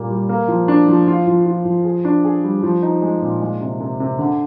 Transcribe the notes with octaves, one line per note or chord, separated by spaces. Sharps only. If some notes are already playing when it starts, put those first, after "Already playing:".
Already playing: A#2 G3 A#3
G3
A#3
F3
D4
F3
F4
F3
F4
F3
G#4
D4
G#4
G3
F3
D#4
G#3
A#2
G#3
C3
C3
C3
D3